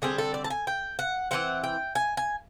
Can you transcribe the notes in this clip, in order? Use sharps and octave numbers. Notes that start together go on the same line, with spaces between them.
D3 G3 C4 G#4
A4
D5
A5
G#5
G5
F#5
E3 G#3 C4 F#5
G5
G#5
G#5